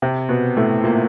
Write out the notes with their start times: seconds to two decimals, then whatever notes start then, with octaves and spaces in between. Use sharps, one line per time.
0.02 C3 C4
0.29 B2 B3
0.57 A2 A3
0.83 A#2 A#3